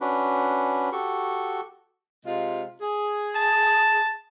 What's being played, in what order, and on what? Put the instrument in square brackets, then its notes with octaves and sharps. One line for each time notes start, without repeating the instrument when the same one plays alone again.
[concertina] C#4 D4 F#4 B4
F#4 G4 A4 C#6
[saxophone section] C3 G#3 F4
G#4
[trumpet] A5